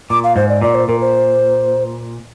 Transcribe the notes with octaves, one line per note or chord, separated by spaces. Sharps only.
A#2 D6
F5
G#2 C5
D5
A#2 D5
C5
A#2 A#4
C5